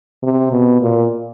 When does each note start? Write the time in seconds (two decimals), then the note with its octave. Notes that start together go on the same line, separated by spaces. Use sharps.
0.23 C3
0.52 B2
0.81 A#2